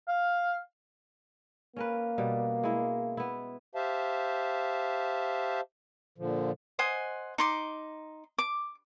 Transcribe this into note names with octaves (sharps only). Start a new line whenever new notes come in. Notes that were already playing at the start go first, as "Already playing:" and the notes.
F5
A#3 C#4 A#4 B4
B2 G3
G#3 E4
B3 E4
G4 C5 E5 F5 A5
A#2 D3 F3
C5 D#5 F#5 G#5
D#4 C6 D6
D6